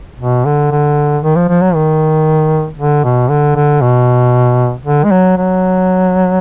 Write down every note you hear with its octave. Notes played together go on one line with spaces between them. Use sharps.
B2
D3
D3
D#3
F3
F3
F#3
D#3
D3
B2
D3
D3
B2
D3
G#3
F#3
F#3